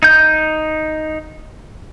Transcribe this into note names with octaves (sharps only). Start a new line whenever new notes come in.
D#4 G6